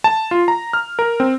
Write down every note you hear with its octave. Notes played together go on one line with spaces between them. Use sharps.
A5
F4
A#5
F6
A#4
C4